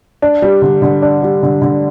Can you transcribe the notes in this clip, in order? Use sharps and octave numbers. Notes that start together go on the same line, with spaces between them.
D4
G3
D3
D3
D4
G3
D3
D3